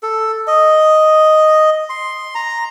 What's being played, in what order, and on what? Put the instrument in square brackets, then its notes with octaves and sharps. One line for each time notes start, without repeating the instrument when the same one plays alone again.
[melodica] A4
D#5
C6
A#5